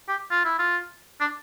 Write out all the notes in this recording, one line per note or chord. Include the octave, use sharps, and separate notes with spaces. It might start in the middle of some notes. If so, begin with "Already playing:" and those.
G4
F4
E4
F4
D4